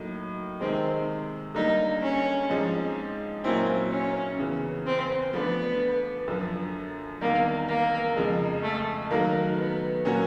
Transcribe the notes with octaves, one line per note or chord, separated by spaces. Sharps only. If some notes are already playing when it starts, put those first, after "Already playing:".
Already playing: A2 F#3 A#3 D#4
C3 D#3 G#3 C4
D3 G3 A#3 D#4
C#4
G#2 F3 G#3 C4 D#4
A#2 F#3 A#3 C4 C#4 E4
C#4
E2 C#3 E3
C4
F3 A3 B3 D4
F#2 D3 F3
E2 C3 D#3 G3 A#3
A#3
F2 C#3 F3 G#3
A3
D#3 F#3 A3 A#3
B3
A#2 F#3 A#3 C#4 F#4